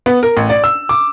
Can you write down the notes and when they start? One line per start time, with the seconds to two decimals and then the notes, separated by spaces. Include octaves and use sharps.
0.06 B3
0.23 A#4
0.37 A1
0.50 D5
0.64 E6
0.89 D6